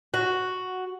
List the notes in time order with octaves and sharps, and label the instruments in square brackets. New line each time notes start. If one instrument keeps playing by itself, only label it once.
[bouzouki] F#4